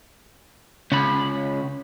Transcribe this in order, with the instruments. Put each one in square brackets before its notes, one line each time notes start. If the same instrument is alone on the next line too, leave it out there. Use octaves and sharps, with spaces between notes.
[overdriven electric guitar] C#2 [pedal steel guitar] C#4 B5